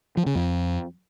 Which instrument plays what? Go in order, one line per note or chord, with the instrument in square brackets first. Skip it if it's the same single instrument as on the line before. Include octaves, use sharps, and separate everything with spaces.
[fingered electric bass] F3
C#3
F2